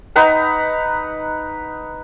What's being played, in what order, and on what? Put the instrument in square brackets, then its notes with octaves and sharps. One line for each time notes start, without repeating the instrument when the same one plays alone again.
[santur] D#4 B4 F#5 A#5